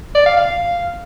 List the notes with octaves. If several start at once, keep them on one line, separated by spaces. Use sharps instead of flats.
D5
F5
F5